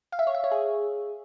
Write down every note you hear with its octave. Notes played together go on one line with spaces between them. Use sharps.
F5
E5
C#5
E5
C#5
G#4